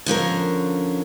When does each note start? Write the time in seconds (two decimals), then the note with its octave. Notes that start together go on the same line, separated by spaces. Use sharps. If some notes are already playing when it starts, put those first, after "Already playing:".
0.06 D3 F3 C#4 A#4